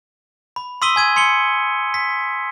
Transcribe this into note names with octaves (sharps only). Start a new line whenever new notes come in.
B5
C6 D#6 E6 B6 D#7 G7
G#5 G#6 D#7
C6 C#7 F7 G7
B6